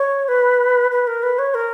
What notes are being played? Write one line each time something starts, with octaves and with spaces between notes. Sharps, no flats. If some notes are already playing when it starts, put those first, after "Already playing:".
Already playing: C#5
B4
B4
A#4
B4
C#5
A#4